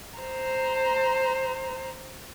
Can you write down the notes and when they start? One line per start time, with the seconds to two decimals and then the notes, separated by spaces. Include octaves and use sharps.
0.18 C5 A#5